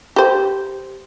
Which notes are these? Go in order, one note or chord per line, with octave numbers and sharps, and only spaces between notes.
G4 C5